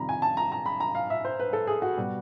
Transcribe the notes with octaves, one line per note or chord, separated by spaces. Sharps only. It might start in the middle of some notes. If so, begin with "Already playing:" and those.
Already playing: F2 C3 D#3 G3 A#5 B5
G#5
A5
A#5
A#5
B5
A#5
F5
E5
C5
B4
A4
G#4
F#4
B2 G3